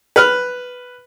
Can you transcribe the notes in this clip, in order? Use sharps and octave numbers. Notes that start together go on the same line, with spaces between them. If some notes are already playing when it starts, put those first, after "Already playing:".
B4 F6